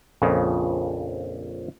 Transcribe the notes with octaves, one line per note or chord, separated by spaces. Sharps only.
A#1 F2 C#3